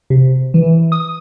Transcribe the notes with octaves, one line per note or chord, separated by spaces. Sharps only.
C3
E3
D#6